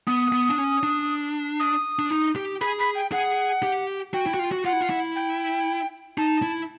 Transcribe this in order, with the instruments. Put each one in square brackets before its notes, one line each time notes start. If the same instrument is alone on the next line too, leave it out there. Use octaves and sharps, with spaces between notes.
[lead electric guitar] B3 [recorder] D#6
[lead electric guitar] B3
D4
C#4
D4
[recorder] D#6
[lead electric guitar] D4
D#4
G4
[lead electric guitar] G#4 [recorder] B5
[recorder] B5
G5
[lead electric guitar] G#4 [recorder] F#5
[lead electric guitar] G4
[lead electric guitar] F#4 [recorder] G5
[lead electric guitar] E4
F#4
F4
F#4
[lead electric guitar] F4 [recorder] F#5
[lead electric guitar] E4
F4
E4
[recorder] G5
[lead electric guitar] D#4 [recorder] A5
[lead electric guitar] E4